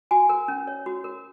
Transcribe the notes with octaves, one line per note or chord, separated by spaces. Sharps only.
F#4 G#5
A#4
C#4
C#5
F#4
A#4